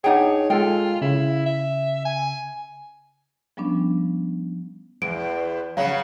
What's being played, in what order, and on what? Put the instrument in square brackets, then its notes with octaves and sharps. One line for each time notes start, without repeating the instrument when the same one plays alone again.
[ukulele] D4 F#5 G5 [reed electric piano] D#4 G#4 [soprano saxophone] C#5
[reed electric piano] G#3 A4 [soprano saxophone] F4 [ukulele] G5
[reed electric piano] C#3 [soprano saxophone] E4
[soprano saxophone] E5
G#5
[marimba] F3 G3 B3 C#4 D4
[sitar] E2 [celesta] D7
[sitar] C#3 F#3 [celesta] F5